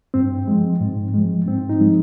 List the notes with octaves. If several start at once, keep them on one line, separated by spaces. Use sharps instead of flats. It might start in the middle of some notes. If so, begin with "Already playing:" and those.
G2 C4
F3 G#3
G#2
F3 G#3
G#2 C4
D#4
F3 G#3